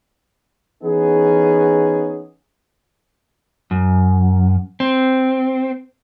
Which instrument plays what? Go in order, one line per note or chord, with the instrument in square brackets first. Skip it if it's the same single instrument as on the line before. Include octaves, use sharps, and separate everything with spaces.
[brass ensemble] E3 B3 C#4 D#4 G#4
[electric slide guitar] F#2
C4